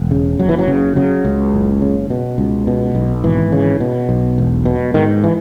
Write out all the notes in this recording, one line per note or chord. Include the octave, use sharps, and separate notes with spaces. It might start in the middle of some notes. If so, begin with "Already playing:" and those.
Already playing: E1
C#3
F#1 F#3
E3
F#3
C#3
C#3 F#3
C#2
F#1
C#3
B2
C#2
B2
B1
G#1 E3
C#3
B2
B1
E1
B2
G#2 D#3
E3